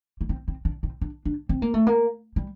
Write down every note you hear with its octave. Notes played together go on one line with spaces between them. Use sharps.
A#3
C4
C4
D4
C4
D4
D4
C4
A#3
A3
A#3
G3